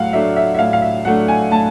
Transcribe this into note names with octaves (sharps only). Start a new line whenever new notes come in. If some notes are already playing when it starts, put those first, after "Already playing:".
Already playing: A2 F#3 A3 F5 F#5
F#3 A3 D4 E5
E5
E5
A2 F5
F5
E5
F#3 A3 D4 F#5
G#5
A2 A5